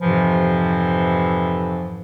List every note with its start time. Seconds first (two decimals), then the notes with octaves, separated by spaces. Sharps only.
0.01 F2 G#2 C3 E3 F3